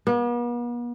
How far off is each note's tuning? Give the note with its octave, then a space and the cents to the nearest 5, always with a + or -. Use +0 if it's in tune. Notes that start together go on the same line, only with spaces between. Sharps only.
B3 -45